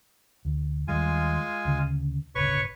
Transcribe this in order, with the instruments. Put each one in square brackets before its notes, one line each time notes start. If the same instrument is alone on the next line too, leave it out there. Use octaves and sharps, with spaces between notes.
[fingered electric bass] D2
[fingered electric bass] D#2 D#3 G3 [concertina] G#3 F4 G#5
[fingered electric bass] D2 C#3
[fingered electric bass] D1 G1 C#3 [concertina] B4 C#5 C#6